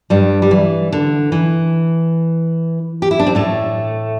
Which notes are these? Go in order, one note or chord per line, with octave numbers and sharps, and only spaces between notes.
G2 G3
G3
E3
D3
E3
G4
E4
D4
C4
A2 A3